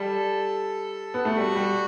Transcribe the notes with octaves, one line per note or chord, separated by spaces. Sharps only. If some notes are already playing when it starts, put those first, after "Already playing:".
Already playing: G3 A4
B3
A3
G3 F#4
G3